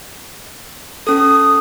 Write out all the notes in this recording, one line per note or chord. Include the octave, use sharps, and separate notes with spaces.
C#4 A4 D#6